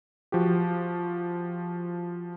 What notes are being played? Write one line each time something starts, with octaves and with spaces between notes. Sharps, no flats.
F3 F#4 G4